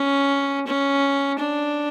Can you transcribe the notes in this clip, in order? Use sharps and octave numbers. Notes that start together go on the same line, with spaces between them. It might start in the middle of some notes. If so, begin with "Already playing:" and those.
Already playing: C#4
C#4
D4